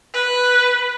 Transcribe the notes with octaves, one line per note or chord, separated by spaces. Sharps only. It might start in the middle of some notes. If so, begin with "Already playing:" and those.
B4